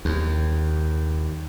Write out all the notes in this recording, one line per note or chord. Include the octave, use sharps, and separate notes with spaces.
D#2